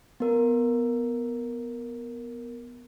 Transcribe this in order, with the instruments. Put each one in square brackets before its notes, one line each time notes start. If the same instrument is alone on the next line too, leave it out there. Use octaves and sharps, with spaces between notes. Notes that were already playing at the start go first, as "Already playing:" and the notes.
[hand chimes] B3 A#4